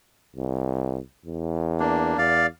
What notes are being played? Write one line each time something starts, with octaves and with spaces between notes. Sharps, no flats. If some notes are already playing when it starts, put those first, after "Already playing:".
C2
E2
A#3 D4
E2 D5 F5